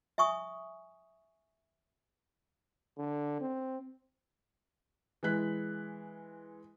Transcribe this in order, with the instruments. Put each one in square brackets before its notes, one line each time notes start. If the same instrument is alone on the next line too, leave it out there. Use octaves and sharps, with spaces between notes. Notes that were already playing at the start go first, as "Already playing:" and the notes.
[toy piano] E5 G#5 C#6 D#6
[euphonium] D3
C4
[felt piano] E3 G#3 F#6 B6